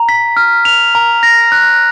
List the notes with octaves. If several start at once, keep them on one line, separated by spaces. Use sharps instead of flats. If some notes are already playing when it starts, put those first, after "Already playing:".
Already playing: A#5
B6
F6
F7
A#5
A#6
F#6